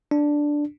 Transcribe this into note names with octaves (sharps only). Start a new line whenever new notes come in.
D4